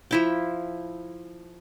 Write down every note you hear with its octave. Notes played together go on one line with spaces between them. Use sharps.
F3 E4 G5